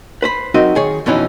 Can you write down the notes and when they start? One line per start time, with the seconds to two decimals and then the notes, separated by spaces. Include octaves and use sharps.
0.22 B4 C5 B5
0.54 F#3 C4 D#4 F#4 A#4 D#5
0.75 D#3 G#4 C#5
1.06 F2 B2 E3 C#4 D#4